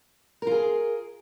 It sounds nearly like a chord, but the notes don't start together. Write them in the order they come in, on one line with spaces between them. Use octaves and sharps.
A#4 F4 G#4